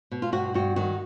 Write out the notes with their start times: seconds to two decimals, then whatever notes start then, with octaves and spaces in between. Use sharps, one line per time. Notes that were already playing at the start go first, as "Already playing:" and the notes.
0.12 B2
0.22 F4
0.32 G2 F#4
0.54 G2 F#4
0.76 D#3 F#4